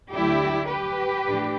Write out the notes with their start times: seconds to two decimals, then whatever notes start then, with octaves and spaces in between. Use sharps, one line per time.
0.13 D2 D3 F#3 A3 D4 E4 G4
0.68 G4 B4
1.24 A2 E3 A3 D4